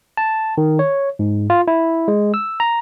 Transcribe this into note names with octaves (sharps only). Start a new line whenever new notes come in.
A5
D#3
C#5
G#2
F4
E4
G#3
E6
A#5